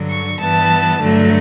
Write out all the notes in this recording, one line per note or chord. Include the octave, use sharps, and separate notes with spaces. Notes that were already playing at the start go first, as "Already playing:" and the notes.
Already playing: G2 D3 F#3
C#6
G2 E3 G3 B3 A5
G2 D3 F#3 A3